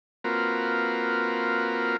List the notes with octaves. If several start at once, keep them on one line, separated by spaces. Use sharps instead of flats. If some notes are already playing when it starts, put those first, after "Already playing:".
A#3 C4 F4 F#4 A#4 B4